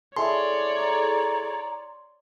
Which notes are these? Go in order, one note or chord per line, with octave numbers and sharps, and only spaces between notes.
E4 G#4 A4 C#5 D5 C6
A#5